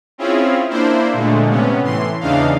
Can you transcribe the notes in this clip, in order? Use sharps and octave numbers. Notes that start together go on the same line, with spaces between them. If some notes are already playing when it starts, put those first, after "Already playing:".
C4 C#4 E4 F4 G#4
A#3 D4 E4 C5
A#2 D3 G#3 A3
C3 B3 C#4
A2 E3 C6
E2 C#3 E3 D4 D#4 F5